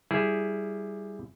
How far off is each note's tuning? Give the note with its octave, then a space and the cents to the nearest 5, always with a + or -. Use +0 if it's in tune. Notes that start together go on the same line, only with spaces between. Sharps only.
G3 +0 E4 +0 G#4 +0